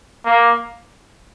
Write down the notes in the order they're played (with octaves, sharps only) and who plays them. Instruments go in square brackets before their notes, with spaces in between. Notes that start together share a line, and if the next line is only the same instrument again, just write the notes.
[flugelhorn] A#3